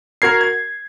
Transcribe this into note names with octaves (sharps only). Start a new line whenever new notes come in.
F#4 A#4 G#6 C7
G#6